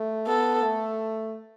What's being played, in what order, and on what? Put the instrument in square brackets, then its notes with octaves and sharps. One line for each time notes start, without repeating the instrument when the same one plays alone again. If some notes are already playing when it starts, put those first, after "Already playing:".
Already playing: [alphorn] A3
[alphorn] B3 [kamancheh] A4
[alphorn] A3